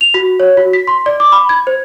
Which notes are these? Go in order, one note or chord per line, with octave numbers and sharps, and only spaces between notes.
F7
F#4
C#5
F#4
B6
C6
D5
D6
B5
G#6
C5